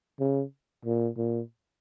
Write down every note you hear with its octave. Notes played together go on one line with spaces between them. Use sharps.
C#3
A#2
A#2